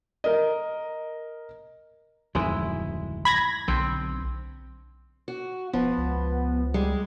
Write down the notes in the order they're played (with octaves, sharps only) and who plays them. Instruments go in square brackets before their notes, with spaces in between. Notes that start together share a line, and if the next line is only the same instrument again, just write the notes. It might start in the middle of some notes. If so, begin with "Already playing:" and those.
[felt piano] A#4 D#5
[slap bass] D1 F2 D#3 [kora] G#3 E4
[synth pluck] B5 G#6 A#6
[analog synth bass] B1 [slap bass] D3 [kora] C4
[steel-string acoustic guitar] F#4
[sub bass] E1 [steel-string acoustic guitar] F3 [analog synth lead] B3
[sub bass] C#2
[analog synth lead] G3 [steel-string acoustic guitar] G#3